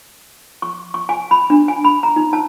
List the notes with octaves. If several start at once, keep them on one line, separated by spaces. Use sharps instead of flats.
C#6
C#6
G#5
B5
D4
G#5
B5
A#5
D#4
A5